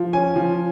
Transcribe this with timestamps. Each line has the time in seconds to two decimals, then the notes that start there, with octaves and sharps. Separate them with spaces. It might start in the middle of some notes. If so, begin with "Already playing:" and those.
Already playing: F3
0.13 C#4 G#5
0.36 F3